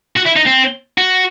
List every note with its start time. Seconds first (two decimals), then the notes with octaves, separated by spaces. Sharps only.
0.17 F#4
0.26 E4
0.37 D#4
0.47 C4
0.98 F#4